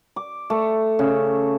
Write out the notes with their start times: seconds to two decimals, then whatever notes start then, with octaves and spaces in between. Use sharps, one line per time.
0.16 D6
0.50 A3
0.99 C#3